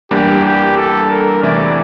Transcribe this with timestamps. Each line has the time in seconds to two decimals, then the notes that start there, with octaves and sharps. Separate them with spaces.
0.11 E2 E3 G3 A#3 D4 G4
0.44 G4
0.76 A4
1.10 A#4
1.43 E2 C3 E3 A3 E4 D5